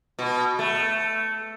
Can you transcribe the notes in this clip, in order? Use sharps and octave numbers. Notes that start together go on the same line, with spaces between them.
B2
A3